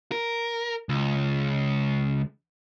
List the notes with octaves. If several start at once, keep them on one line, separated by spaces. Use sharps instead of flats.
A#4
C#2